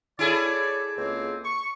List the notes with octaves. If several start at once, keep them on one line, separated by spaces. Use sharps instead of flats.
E4 G#4 A4 C#5 D5
C#2 A#3 C4
C#6